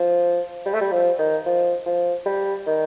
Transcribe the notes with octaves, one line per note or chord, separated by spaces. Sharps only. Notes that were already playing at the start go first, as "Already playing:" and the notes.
Already playing: F3
G3
A3
G3
F3
D#3
F3
F3
G3
D#3